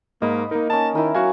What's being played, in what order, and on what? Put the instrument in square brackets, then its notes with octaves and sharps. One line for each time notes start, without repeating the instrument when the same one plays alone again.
[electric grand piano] G#2 [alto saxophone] A#3 [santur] D#5 B5
[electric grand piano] A#3 A#4 [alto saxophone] D#4
[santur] C#4 D#4 [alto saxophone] A5
[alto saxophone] D#3 [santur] E4 A#4
[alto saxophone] F#3 [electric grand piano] F#4 F5 G#5 [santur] C#5 F#5 A#5